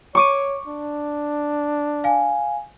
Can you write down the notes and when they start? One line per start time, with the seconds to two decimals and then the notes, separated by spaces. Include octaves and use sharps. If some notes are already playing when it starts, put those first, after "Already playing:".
0.15 C#5 C#6 D6 D#7
0.67 D4
2.04 F5 G#5